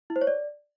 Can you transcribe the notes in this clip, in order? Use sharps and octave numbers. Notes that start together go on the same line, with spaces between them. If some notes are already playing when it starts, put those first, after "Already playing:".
E4
C5
C#5
D5